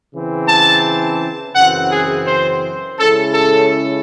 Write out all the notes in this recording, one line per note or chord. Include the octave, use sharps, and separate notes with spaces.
C#3 E3 C4
A5
F#2 C#3 E3 C4 F#5
G#4
C5
C#3 G#3 C#4 E4 A4
A4